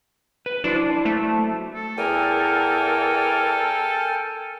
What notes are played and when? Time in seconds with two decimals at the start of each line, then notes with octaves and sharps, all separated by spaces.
0.46 B4
0.64 F#3 D4 E4 C5
1.05 A3
1.75 A4
1.97 E2 A#4 G5 G#5